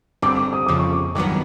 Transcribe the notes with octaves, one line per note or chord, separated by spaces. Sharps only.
G2 D3 G3 C4 D6
D6
D#6
F2 C#3 F3 D6
C#6
D6
G2 D#3 F#3 B3 D6